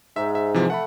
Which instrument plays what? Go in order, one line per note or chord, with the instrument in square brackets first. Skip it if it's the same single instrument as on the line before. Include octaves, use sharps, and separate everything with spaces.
[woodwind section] G#2 [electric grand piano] E5
[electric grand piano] E5
C3 E3 F3
[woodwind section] A3 [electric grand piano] F#5 B5